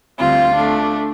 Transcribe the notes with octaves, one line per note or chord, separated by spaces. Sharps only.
D2 D3 G3 C4 F4
A3 D4